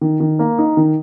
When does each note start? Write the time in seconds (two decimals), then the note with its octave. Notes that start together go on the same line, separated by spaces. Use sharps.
0.01 D#3
0.20 D#3
0.39 A#3
0.58 D#4
0.77 D#3